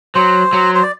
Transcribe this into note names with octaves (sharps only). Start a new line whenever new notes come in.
F#3 C5
F#3
C5
D5